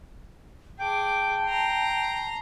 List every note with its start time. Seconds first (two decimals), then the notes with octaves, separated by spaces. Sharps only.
0.80 G#4 G5 A5 D6
1.46 A#5 C6